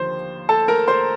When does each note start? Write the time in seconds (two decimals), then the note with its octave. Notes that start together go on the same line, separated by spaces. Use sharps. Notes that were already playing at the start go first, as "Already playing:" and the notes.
Already playing: D#2 D3 F3 C5
0.49 A4 A5
0.68 A#4 A#5
0.88 C5 C6